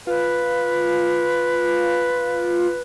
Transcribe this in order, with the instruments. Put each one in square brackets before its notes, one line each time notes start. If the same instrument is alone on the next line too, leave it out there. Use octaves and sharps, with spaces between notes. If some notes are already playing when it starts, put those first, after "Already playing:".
[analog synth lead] F4 [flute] B4